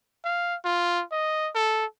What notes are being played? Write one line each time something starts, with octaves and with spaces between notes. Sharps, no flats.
F5
F4
D#5
A4